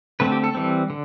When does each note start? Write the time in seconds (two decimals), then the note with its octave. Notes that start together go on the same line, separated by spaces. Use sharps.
0.20 D3 A3 C4 B4
0.32 G4
0.44 A4
0.55 E3 G3 C4
0.90 D3